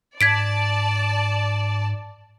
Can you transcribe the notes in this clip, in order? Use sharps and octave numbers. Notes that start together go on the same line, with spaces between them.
G#2 D5 A5 G#6 B6 D7